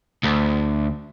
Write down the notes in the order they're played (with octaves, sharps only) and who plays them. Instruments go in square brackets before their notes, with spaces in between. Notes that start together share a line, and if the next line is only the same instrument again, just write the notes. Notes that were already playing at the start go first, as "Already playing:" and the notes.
[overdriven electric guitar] D2